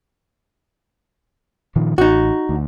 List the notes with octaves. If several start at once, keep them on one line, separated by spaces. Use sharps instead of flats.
A#2 D#3 F3
A1 D#4 F#4
D2